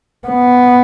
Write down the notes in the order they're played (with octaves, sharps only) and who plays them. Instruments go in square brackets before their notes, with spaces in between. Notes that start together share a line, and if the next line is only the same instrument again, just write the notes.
[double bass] B3